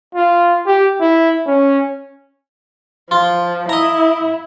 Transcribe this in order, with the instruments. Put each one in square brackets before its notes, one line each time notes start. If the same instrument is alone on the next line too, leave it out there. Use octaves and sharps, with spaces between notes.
[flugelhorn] F4
G4
E4
C#4
[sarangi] F3 [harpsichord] F4
[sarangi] E4 [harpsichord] D#5 A#5